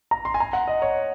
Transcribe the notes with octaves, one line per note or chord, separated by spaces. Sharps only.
A#5
C6
G#5
A#5
F#5
D#5
C#5